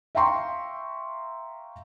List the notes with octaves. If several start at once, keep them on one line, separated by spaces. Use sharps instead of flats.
E5 F5 G5 A#5 C6 C#6